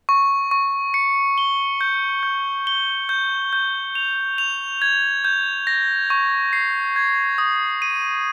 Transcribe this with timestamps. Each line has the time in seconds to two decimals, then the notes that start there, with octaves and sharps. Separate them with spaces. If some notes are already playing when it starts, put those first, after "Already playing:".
0.09 C#6
0.51 C#6
0.94 C#7
1.38 G7
1.81 G6
2.23 G6
2.67 G7
3.09 G6
3.53 G6
3.95 F7
4.38 F7
4.82 G#6
5.24 G6
5.67 A#6
6.10 C#6
6.53 C7
6.96 G#6
7.38 D#6
7.82 D#7